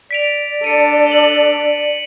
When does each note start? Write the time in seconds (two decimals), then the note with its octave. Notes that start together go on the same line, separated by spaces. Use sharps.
0.11 D5 B6 D7 F7
0.64 D4 A4 C#7 D#7
1.12 F#7